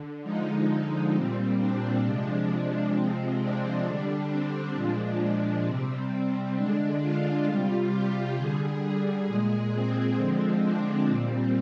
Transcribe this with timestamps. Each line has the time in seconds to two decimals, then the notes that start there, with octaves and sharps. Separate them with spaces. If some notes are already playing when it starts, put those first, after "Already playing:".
Already playing: D3
0.23 D3 F3 G#3 D#4
0.68 D#4
1.13 A#2 G3 C4
1.59 D4
2.04 C3 F3 G#3 D4
2.94 C3 F3 G#3 C4
3.40 D4
3.85 D3 G3
4.29 C4
4.75 A#2 F3 G#3 D4
5.65 C3 G3 C4
6.56 D3 G#3 D4
7.01 F4
7.46 C3 G3 F4
7.91 G4
8.36 D3 G3 G#4
9.27 A#2 G#3
9.72 C4
10.17 D3 F3 G#3
10.62 D4
11.08 A#2 G3 C4